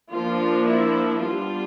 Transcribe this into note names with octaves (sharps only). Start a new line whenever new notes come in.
F3 A#3 D4 F4
E4
G3 B3 D4 F4